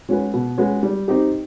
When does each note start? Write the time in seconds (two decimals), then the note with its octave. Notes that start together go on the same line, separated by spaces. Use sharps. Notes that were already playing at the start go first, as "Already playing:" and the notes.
0.09 G#3 C#4 F#4 B4
0.33 B2
0.58 G#3 C#4 F#4 B4
0.83 G3
1.08 C4 D#4 G4